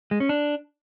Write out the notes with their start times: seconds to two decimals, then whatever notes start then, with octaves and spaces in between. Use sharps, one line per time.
0.11 G#3
0.20 C#4
0.29 D4